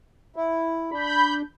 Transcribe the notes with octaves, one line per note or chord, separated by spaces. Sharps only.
E4
D4 B5 G6